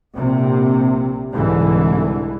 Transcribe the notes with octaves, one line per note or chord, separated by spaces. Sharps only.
A#1 C3
C2 G#2 D3 E3